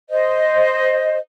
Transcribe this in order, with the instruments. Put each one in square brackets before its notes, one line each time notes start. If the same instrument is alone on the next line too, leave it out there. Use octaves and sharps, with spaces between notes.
[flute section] C5 D#5